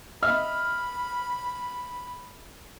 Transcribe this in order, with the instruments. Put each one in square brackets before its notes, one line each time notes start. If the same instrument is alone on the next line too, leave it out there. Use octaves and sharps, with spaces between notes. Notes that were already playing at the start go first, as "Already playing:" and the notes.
[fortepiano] D#5 E5 [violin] B5 [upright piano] F6